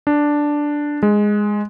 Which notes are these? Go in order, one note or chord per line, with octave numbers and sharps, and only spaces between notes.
D4
G#3